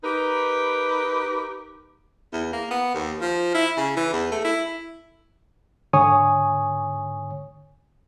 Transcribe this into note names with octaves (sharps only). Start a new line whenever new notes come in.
D#4 G4 A#4 B4
E2
A#3
B3
D#2
F3
E4
C#3
E3
E2
A3
E4
G#2 D3 C#5 G#5 C#6 D#6